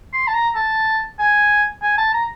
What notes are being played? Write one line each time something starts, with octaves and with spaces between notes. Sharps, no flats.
C6
A5
A#5
A5
G#5
G#5
A5
A#5